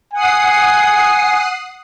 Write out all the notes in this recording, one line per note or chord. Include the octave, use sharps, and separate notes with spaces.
F#5 G#5 D#6 C7